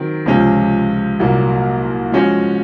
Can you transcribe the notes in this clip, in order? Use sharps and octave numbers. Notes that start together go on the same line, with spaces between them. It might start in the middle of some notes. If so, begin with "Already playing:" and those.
Already playing: D#3 F#3 C4
C#2 C3 F3 G#3 C#4
C2 A#2 F#3 A#3
F3 G#3 C#4 F#4 C#5